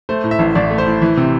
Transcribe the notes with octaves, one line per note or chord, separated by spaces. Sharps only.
A3 C5
A2
E5
A1
A1 D5
A3
C5
A2
E3
C3